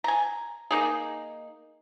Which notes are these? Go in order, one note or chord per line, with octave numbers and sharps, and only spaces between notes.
G#5 A#5
A#3 D#4 G#4